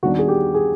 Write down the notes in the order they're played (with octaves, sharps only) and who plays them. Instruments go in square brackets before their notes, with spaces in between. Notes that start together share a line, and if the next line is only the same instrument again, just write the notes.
[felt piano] D#2 D#3 G3 B3 D4 [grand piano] F#4
[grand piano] G#4
G4
G#4